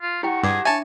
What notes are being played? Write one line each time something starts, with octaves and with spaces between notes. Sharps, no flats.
F4
E4 G4 F#5 G5 C#6
G2 G#4 A5 D6
D4 C#5 E5 G#5 A5